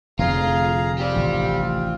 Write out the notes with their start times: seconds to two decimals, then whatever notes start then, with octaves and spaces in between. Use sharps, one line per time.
0.19 F1 F2 D3 F4 G#4 F5 A#5
0.98 C4 F4 G4 D5
1.16 A1 D#3 E3